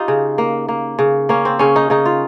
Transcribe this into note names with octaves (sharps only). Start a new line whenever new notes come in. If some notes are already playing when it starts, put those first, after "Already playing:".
Already playing: D#4 F4 G4
C#3
A#3
A#3
C#3
A#3 C#4
C4
C#3 C#4
D#4
C#3 D#4
F4